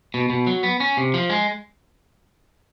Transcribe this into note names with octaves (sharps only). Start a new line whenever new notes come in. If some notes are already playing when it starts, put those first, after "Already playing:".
B2
B2
F#3
B3
C#4
C3
F3
G#3